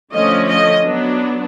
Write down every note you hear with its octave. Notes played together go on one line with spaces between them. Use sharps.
D3 F3 A3 C#4 D#5
D#5
F#3 B3 D4